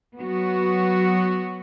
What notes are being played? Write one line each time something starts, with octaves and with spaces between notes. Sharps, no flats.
F#3 B3 F#4